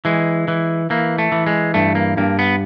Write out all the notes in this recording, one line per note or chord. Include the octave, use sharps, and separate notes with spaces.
E3 G#3
E3
E3 A#3
A3
E3
G#3
G2 A3
A#3
G2 A#3
B3